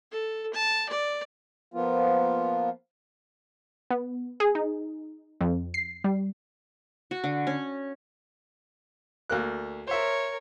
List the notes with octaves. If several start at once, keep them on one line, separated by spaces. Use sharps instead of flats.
A4
A5
D5
F3 A#3 B3 F4
B3
G#4
D#4
F2
C7
G3
F#4
D3
C#4
D2 A#3 F#6
A#4 C5 C#5 E5